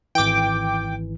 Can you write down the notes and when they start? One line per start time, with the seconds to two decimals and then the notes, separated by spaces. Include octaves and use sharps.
0.15 G#1 E3 G5 D6